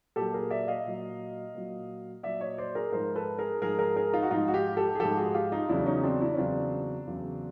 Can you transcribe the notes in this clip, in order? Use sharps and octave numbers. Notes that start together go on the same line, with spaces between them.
A#2 F#3 G4 A4
G#4 A#4
D5 E5
D#5 F5
A#2 F#3
A#2 F#3
A#2 F#3 D5 E5
C#5 D#5
C5 D5
G#4 A#4
G#2 F3 A#4 C5
A4 B4
G#4 A#4
G#2 F3 G#4 A#4
G#4 A#4
G#4 A#4
D#4 F4
F#4
G#2 F3 D#4 F4
F#4
F4 G4
G4 A4
G#4
G#2 F3 G4 A4
F#4 G#4
F4 G4
D#4 F4
E2 C#3 F#3 D4 E4
C#4 D#4
C4 D4
D4 E4
C#4
E2 C#3 F#3 C4 D4
E2 C#3 F#3